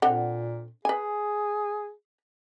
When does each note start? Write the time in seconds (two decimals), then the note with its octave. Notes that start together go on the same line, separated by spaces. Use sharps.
0.02 A#2 D3 C4 F#5
0.85 G#4 B4 G#5